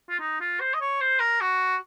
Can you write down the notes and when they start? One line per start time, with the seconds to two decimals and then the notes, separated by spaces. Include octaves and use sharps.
0.09 F4
0.19 D#4
0.40 F4
0.60 C5
0.74 D#5
0.81 C#5
1.00 C5
1.20 A#4
1.41 F#4